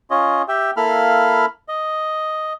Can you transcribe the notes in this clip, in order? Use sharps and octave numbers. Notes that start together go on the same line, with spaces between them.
C#4 F4 C#5 D#5
G4 E5 G5
A#3 E4 A4 F5 B5 F6
D#5